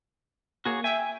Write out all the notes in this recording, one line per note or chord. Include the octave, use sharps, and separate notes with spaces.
A#3 F#4 G#4 C#5
E5 G5 G#5